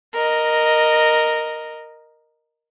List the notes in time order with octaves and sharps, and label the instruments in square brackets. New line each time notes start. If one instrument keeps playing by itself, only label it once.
[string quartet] A#4 D#5